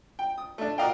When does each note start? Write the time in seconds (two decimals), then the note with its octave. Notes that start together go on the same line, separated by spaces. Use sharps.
0.19 G5
0.38 D#6
0.58 A3 D4
0.78 F#4 A#4 D5 D#5 F5 G5